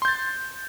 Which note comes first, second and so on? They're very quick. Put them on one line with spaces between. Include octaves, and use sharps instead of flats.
C6 G6 A6